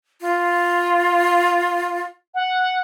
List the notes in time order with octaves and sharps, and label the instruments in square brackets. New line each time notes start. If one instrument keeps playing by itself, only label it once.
[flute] F4
[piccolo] F#5